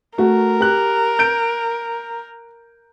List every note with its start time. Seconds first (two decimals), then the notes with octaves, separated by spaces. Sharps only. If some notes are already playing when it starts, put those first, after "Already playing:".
0.18 A3 F#4 A#4
0.60 G4 F#6
1.19 G6 D7